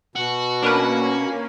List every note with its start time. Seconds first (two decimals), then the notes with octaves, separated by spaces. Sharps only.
0.16 B2 F#4
0.62 A#3 C#4 D4 A#4 B4